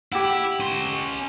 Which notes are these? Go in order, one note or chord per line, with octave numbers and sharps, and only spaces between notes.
E4 G4 F#5
C#4 C6